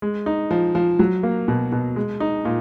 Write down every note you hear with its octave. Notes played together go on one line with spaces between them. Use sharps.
G#3
D#4
F3
F3
F#3
A#3
B2
B2
G#3
D#4
A#2